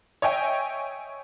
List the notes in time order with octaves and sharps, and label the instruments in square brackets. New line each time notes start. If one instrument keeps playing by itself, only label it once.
[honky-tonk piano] C#5 D#5 E5 G5 G#5